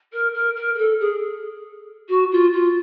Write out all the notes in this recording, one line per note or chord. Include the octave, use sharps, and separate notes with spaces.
A#4
A#4
A#4
A#4
A4
G#4
F#4
F4
F4